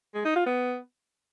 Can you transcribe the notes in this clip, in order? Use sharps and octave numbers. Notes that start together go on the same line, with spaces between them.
G#3
D#4
F4
B3